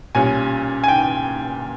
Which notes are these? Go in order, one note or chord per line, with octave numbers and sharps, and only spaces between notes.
B1 A#2 G3 C#4 G#5
G#5
G5